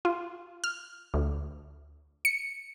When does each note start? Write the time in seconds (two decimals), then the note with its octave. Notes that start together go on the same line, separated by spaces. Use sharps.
0.05 F4
0.64 F6
1.14 D2
2.25 C#7